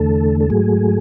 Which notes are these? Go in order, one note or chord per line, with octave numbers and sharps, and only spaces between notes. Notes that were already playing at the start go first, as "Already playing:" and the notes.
Already playing: E2 D3 A3 A4
A4
G#2 F#3 A3 G#4